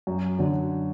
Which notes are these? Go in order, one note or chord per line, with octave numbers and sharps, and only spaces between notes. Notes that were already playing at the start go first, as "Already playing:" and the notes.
F#2
D3 F#3